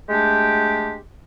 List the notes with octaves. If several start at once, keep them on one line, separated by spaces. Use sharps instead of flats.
G#3 A3 D4 G4